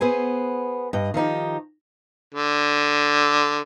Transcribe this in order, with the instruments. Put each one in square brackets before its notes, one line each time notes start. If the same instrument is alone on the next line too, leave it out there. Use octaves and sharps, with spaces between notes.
[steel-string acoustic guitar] B3 G#4 C5 G#5
G2 D#5
D#3 F3 D#4 G4
[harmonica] D3